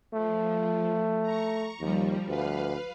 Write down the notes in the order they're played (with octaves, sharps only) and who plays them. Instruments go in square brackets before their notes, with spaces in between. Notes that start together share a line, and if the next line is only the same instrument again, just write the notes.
[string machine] F3 [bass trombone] A3
[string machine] A#5 C#6
[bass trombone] D#2 [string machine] F3 G3
[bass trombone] D2 [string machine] B4 F5